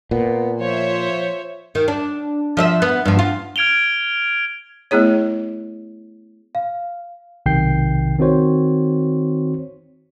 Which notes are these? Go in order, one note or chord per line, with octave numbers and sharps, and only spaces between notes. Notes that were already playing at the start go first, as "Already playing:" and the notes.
A#2 B3
F3 C5 C#5 E5
D#3
D4
F3 D#5 E5
B3
G2 F3
F4
F6 G#6 D7 F7 G7
A3 B3 E4 G#4 C#5
F5
B1 C3 D#3 G5 G6 C7
D#3 C4 F#4 C5 C#5